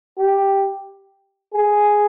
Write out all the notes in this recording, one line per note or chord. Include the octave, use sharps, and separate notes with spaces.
G4
G#4